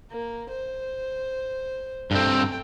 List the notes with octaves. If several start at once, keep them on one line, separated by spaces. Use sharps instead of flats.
A#3
C5
G2 A3 C4 G5